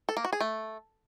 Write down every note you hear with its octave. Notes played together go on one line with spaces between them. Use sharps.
A4
A#3
F#4
G#4
A3